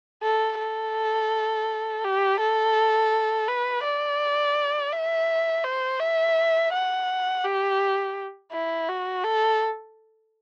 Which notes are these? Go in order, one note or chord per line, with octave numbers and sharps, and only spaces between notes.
A4
A4
G4
A4
B4
D5
E5
C5
E5
F#5
G4
E4
F#4
A4